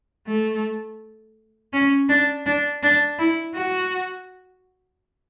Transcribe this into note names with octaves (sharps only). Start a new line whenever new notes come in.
A3
C#4
D4
D4
D4
E4
F#4